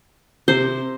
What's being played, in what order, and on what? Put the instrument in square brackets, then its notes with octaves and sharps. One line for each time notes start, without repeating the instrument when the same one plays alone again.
[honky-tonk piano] C3 [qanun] C5